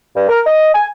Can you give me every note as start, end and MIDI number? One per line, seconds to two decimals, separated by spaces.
0.16 0.28 43
0.29 0.41 70
0.46 0.74 75
0.75 0.87 80